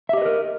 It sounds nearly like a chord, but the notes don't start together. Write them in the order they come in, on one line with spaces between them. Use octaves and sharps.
E5 G4 D#5 B4 A#4